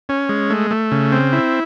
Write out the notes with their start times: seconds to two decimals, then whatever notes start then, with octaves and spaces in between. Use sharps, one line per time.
0.09 C#4
0.29 G#3
0.50 A3
0.71 A3
0.92 C#3
1.12 C4
1.33 E4